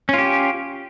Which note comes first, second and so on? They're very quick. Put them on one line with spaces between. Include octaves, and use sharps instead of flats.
C#4 F4 G4